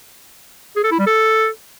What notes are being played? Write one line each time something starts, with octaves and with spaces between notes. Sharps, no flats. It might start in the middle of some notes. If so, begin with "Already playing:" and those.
G#4
A4
E4
G3
A4